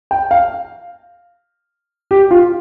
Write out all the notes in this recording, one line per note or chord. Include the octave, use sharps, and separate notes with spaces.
G5
F5
G4
F4